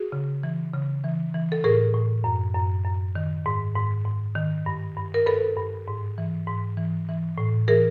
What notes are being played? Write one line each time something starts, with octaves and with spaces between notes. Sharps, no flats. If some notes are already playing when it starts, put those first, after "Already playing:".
Already playing: F#4 G#4
C#3
E3
C#3
E3
E3
A4
A2 G#4 A#4
A2
F#2
F#2
F#2
D#3
G#2
G#2
G#2
D#3
G2
G2
A#4
G2 A4 B4
G2
G#2
E3
G#2
E3
E3
A2
E3 G#4 A#4